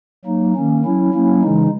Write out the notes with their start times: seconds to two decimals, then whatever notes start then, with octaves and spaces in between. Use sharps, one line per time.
0.25 F#3 A#3 D#4
0.55 D#3 A#3 C#4
0.84 F#3 C#4 E4
1.14 F#3 A#3 C#4 E4
1.42 C#3 E3 G#3 D#4